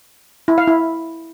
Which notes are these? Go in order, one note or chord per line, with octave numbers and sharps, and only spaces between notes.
E4
F5
E4